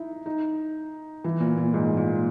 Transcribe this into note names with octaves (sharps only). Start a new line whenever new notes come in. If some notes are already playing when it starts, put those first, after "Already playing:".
Already playing: D#4 E4
D#4
E3
A#2
A#2
G#2
A#2